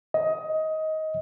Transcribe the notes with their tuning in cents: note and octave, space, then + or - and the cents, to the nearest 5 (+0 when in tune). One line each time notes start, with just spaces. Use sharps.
D#5 +20